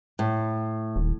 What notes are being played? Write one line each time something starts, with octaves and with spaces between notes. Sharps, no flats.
A2
D#1